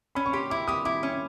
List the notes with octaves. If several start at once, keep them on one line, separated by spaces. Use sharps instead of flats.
C#4 B5
C#6
G4 C6
E4 D6
G4 D#6
E4 D6
C#4